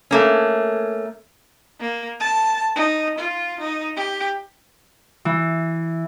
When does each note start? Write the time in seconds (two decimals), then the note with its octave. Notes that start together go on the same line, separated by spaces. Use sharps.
0.11 A3 A#3 C#4
1.80 A#3
2.20 A5
2.76 D#4
3.19 F4
3.60 D#4
3.96 G4
5.25 E3